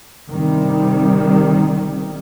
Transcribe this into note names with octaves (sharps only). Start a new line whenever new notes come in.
G1 C3 D#3 G3